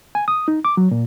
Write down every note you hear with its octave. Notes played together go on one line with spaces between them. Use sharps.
G#5
D#6
D#4
D6
F#3
A#2